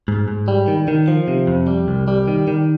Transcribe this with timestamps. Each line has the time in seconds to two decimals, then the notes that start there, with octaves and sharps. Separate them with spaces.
0.08 G#2
0.28 G#2
0.48 G3
0.68 D#3
0.88 D#3
1.08 F3
1.28 C3
1.47 F2
1.67 G3
1.88 C2
2.08 G3
2.28 D#3
2.48 D#3